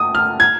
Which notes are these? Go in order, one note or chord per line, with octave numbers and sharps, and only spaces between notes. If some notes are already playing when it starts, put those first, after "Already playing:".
Already playing: D#6
F6
G#6